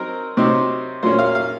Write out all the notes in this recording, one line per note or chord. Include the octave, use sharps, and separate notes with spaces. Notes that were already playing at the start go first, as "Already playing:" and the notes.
Already playing: F#3 C4 D#4 A#4
C3 F#3 C4 D#4
A#2 F#3 A#3 C#4 C5
F5
F5